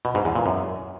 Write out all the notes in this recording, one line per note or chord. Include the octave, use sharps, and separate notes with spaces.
B2
G#2
E2
A#2
F#2